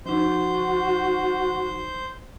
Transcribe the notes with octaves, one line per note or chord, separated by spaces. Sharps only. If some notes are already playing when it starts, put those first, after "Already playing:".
F3 D#4 F#4 C5 G6